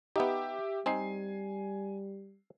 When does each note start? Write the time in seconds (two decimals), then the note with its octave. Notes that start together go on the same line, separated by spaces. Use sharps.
0.16 B3 D#4 G4 E5 G5
0.86 G3 C4 D#4 G#5 C7